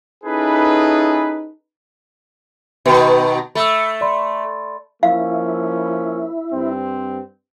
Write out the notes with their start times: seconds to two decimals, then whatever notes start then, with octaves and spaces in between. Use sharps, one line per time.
0.24 C#4 D#4 E4 G#4 A4 B4
2.86 B2 D#3 B4 G5 B5
3.55 A3 B5 E6
4.01 D5 B5 C6
5.03 F3 A#3 C#4 E4 F5
6.52 G2 C4